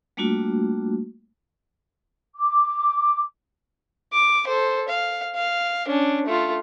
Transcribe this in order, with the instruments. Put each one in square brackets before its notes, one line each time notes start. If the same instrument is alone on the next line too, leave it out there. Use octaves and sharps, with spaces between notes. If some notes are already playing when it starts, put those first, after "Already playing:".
[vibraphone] G3 A3 A#3 D4 F4 F#4
[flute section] D6
[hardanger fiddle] D6
A4 C5
F5
F5
C#4 D4
A3 F4